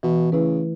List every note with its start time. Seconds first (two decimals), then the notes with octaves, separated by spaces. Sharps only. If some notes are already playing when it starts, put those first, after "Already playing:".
0.03 B2 E3
0.32 C#3 A3 E4 B4